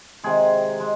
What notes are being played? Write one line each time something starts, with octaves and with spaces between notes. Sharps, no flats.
C3 D#3 G#3 G#4
G#3